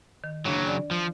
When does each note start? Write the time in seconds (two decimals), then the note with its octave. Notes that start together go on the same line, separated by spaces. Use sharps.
0.24 D#3
0.46 C#3 F#3 D4
0.68 D5
0.91 F3